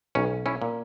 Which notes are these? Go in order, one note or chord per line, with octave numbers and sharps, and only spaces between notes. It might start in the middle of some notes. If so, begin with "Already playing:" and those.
B1 C#4
C#4 E4
A#2